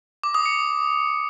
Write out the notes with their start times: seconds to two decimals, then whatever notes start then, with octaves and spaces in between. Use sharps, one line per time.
0.23 D6
0.35 D#6
0.46 C#7